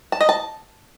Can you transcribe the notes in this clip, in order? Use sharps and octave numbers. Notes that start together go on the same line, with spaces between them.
A5
D#5
A5